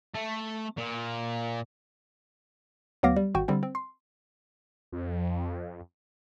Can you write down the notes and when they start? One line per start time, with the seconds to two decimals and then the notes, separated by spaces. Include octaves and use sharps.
0.14 A3
0.77 A#2
3.03 D2 F#3 B3 F5 D6 A#6
3.16 G3
3.35 G#1 F#4 G5
3.48 D3 G3 C4
3.63 C4
3.75 C6
4.92 F2